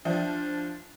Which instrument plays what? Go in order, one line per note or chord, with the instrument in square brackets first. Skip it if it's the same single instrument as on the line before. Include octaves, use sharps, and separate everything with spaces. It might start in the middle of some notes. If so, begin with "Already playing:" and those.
[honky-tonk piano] F3 [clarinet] D4 [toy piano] D5 E5 G5